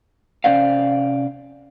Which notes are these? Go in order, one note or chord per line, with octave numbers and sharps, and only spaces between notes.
C3 E3 C#4 D5 F5